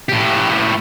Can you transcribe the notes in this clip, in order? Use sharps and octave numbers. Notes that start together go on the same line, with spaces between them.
A2 G4